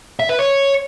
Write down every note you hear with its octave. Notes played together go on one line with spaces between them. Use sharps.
E5
B4
C#5